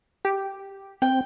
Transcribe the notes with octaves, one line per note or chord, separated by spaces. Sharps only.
G4
C4 G5